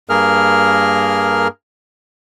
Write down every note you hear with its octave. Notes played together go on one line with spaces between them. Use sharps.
G2 A#3 G#4 A#4 F6